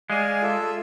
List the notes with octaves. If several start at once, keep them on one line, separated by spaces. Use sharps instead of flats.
G#3 G#4 D5 F5 G#5
F4 A4 E5